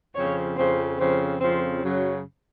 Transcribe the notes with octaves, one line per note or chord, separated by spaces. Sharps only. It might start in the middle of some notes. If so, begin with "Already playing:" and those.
F2 C#3 F3 C4 C#5
F2 C#3 F3 C4 C5
F2 C#3 F3 C4 C5
F2 C#3 F3 C4 C5
F#2 C#3 F#3